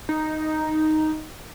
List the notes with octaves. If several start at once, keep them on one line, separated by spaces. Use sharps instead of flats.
D#4